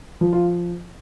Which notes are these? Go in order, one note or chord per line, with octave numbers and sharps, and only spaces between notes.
F3
F4